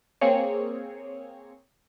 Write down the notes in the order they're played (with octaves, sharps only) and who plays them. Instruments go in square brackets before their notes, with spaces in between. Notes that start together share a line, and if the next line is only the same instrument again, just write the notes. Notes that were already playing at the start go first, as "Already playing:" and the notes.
[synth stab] A#3 C4 G#4 C#5 C#7